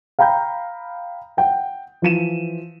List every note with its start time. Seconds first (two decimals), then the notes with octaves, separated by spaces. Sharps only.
0.19 F5 G5 A#5 B5 G6
1.37 F#5 G5
2.02 E3 F3 D#7 E7